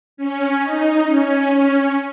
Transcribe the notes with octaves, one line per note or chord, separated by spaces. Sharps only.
C#4
D#4
C#4